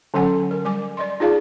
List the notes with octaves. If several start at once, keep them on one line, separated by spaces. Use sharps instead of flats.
D3 F#3 C#4 A4 F#5 G#5
A#4
G3 G#5 D6
D5 D#5 C6
D#4 F4 G#4 D5 F5 A5